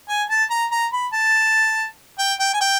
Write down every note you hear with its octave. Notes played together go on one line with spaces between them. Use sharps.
G#5
A5
A#5
A#5
B5
A5
G5
G5
G#5
G5